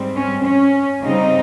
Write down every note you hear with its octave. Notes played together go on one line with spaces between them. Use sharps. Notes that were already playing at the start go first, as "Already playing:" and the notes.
Already playing: G#2 G3 C4
C#4
C#4
C#3 G3 C4 D#4